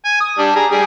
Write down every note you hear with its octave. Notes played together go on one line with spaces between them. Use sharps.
G#5
D#6
G3 D4
G#4 A#5
G3 G#4